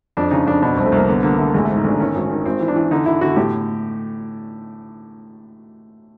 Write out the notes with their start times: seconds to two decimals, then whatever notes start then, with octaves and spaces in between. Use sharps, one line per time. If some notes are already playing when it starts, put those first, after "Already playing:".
0.17 F2 D4
0.31 C#3 D#4
0.46 F2 D4
0.62 B2 D4
0.74 C2 C4
0.85 A3
0.92 C2 A#3
1.08 D3 B3
1.23 D3 A#3
1.38 D3 A3
1.54 A1 G#3
1.65 G#2 A3
1.77 D#4
1.84 A1 D4
1.99 D#3 C#4
2.15 G#1
2.30 D#3
2.46 G#1 C4
2.60 E3
2.68 D4
2.76 E3
2.91 D3 D#4
3.06 D3 E4
3.21 D3 F#4
3.36 A2 G4